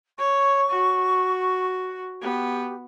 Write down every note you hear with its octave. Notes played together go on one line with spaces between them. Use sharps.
C#5 C#6
F#4
B3 G4